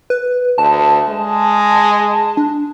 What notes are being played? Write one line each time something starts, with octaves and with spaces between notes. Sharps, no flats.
B4
D2 A5
G#3
D4